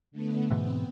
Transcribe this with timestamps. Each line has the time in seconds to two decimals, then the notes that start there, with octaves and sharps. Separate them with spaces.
0.12 D3 A3 B3
0.51 G#2 B2 E3 B3 C4